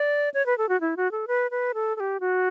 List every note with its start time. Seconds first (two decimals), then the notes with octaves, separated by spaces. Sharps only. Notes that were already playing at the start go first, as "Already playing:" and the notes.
Already playing: D5
0.34 C#5
0.46 B4
0.58 A4
0.69 F#4
0.81 E4
0.97 F#4
1.11 A4
1.28 B4
1.51 B4
1.74 A4
1.96 A4
2.00 G4
2.20 F#4